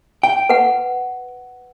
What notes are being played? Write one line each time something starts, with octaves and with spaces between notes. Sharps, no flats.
G5
B4 F#5